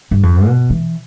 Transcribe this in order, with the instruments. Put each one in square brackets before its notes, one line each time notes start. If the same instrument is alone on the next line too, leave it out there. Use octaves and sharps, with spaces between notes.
[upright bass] G2
F2
B2
E3